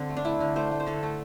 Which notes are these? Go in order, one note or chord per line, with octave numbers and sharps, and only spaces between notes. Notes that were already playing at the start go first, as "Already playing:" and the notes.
Already playing: D3 C4
A3
D4
A3 E4
D3
A3 C5
A3
C5
D3 A4
A3